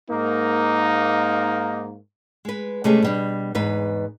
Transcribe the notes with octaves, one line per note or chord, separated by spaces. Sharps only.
G#2 A#3 D#4
G#3 B4
C3 G#3 A3 C#4 G4 G#4
B2 G3 D4
E2 G#2 B4